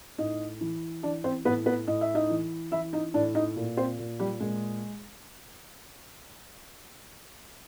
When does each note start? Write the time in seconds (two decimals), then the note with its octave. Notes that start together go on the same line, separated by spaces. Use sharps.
0.18 A2 D#4 D#5
0.61 E3
1.03 E3 D4 D5
1.24 C4 C5
1.45 A2 B3 B4
1.66 B3 B4
1.87 A2 D#5
2.01 E5
2.15 D#4 D#5
2.30 E3
2.71 E3 E4 E5
2.93 D#4 D#5
3.14 A2 D4 D5
3.35 D#4 D#5
3.56 A#2
3.77 C4 C5
3.99 A#2
4.19 G3 G4
4.40 A#2 G#3 G#4